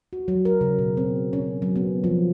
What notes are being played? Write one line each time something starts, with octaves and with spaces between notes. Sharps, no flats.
F#4
F#3
A#4
C#3
B2
C4
C#4
F#3
B3
F3